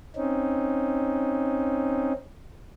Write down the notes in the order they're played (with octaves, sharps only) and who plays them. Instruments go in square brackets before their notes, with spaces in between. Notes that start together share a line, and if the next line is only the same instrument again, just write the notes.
[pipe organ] C4 C#4 D#4